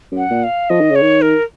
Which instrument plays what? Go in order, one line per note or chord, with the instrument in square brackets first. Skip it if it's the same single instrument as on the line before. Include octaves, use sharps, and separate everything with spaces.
[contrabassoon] F#2
[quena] F#5
[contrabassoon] A#2
[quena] F5
[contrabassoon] F3 [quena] D#5
[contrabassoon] D#3
[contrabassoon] C#3 [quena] C#5
[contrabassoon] D#3
[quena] A#4